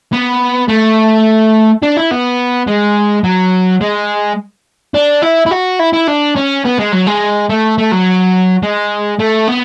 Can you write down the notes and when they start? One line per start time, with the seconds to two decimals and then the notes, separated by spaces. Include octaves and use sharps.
0.13 B3
0.69 A3
1.82 D4
1.97 E4
2.11 B3
2.67 G#3
3.24 F#3
3.81 G#3
4.94 D4
5.22 E4
5.46 E4
5.51 F#4
5.80 E4
5.93 E4
6.07 D4
6.36 C#4
6.65 B3
6.79 G#3
6.92 F#3
7.07 G#3
7.49 A3
7.78 A3
7.92 F#3
8.63 G#3
9.19 A3
9.47 B3